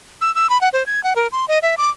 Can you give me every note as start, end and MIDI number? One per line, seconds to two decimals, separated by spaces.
0.21 0.34 88
0.35 0.50 88
0.50 0.60 83
0.61 0.69 78
0.73 0.86 72
0.86 1.03 92
1.04 1.14 78
1.16 1.27 70
1.32 1.45 84
1.48 1.59 75
1.62 1.75 76
1.78 1.90 86